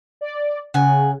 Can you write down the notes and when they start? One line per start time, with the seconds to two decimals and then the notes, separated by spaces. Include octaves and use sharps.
0.21 D5
0.74 C#3 F#5 G#5